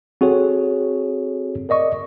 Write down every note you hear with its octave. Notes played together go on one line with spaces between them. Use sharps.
C4 F#4 G#4 A4 C#5
A#4 D5 D#5 C#6